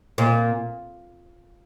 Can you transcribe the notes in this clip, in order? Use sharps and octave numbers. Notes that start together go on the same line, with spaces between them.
A#2